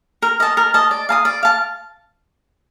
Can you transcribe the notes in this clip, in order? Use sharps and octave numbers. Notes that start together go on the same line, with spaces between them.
A#4
D#5 A5
A#4
D#5 A5
D5
F5 A5 D#6
D5
F5 A5